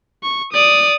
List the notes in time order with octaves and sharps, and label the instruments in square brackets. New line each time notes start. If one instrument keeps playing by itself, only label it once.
[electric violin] C#6
D5 D#6